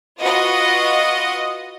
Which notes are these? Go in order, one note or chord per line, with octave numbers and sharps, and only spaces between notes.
F4 F#4 B4 D#5 F#5